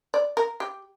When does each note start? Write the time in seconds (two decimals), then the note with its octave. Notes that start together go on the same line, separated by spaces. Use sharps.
0.14 D5
0.37 A#4
0.60 G4